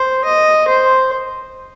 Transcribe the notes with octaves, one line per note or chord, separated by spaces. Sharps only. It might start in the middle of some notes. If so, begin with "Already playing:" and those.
Already playing: C5
D#5
C5